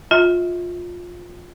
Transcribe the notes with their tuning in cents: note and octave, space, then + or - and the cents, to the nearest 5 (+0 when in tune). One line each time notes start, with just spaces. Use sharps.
F4 +15 E5 -35